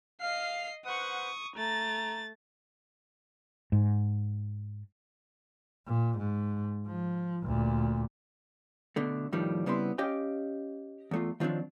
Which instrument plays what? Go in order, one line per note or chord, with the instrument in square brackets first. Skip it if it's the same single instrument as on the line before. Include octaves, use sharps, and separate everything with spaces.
[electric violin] D#5 C7 [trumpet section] F5
[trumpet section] B4 C5 F#5 [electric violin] C#6 D#6
[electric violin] A3 A6 [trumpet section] A#5
[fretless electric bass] G#2
[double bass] A#2
G#2
F3
D2 A#2
[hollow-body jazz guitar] B2 D3 A3
F2 A2 D#3 F3 G3
C#3 G3 B3 C4 E4 C6
C#4 G4 D#5 F5 G5
E2 A3 F4
D#3 F3 F#3 C4 D4